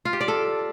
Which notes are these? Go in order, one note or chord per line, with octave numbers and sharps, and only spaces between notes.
F4
G4
D5
A4